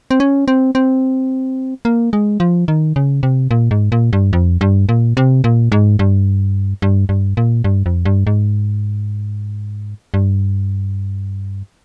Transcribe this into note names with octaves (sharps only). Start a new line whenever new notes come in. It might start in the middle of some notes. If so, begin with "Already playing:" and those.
C4
C#4
C4
C4
A#3
G#3
F3
D#3
C#3
C3
A#2
G#2
A#2
G2
F2
G2
A#2
C3
A#2
G#2
G2
G2
G2
A#2
G2
F2
G2
G#2
G2